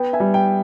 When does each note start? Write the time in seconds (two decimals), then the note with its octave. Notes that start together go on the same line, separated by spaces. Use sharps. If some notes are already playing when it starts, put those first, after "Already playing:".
Already playing: B3 G5
0.13 E5 G#5
0.20 G3
0.34 G5